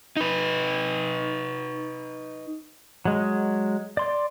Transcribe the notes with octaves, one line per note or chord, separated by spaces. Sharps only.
D#4 B4
F#3 G#3
D5 C6